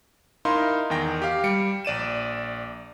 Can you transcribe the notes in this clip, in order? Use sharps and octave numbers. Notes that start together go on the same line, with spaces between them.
D#4 E4 A#4 F5 C6
E2 D#3 G5 A#6
G4 F5
G3 C#7 D7
A#1 D5 D#7 E7